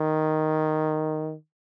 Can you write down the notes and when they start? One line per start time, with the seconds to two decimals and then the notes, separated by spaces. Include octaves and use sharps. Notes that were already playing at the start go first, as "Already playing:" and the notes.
Already playing: D#3